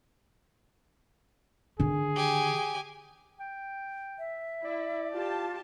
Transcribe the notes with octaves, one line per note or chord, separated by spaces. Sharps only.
D3 D#3 G#4
G4 G#5
G5
E5
E4 D5
F4 G4 A5